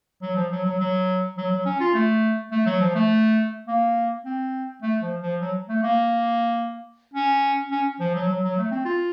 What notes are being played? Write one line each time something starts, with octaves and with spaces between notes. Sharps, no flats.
F#3
F3
F#3
F#3
F#3
F#3
F#3
C#4
F4
A3
A3
F#3
F3
A3
A#3
C4
A3
F3
F3
F#3
A3
A#3
C#4
C#4
F3
F#3
F#3
F#3
A3
C4
F4